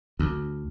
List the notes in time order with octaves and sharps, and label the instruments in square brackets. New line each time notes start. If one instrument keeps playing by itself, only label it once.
[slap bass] D2